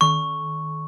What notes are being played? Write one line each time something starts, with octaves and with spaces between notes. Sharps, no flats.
D#3 C#6